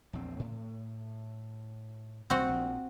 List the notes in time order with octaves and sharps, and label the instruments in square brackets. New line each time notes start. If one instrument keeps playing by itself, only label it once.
[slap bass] A#1 E2 C4
A2
[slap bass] B1 G3 [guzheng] C4 F#4
[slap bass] A#1 F3